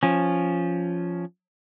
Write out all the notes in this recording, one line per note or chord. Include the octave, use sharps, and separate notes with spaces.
F3 C#4